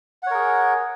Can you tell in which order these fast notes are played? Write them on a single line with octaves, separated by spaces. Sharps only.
F#5 C#5 A#4 G#4